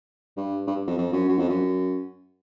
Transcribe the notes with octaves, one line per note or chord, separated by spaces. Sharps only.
G2
G2
F2
F2
F#2
F#2
F2
F#2